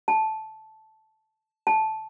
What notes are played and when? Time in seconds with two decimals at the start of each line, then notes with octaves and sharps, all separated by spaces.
0.08 A5
1.67 A5